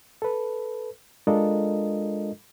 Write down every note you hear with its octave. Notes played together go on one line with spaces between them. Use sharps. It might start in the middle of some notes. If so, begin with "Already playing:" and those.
A4 B4
G#3 D4 F4 A4 A#4 D#5